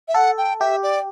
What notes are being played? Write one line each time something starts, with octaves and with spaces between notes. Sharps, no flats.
E5
A4 F#5
G5
G4 E5
D5